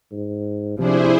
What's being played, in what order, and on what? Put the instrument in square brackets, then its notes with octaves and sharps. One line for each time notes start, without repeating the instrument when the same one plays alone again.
[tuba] G#2
[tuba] C3 [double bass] F3 D4 [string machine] E4 G#4 C5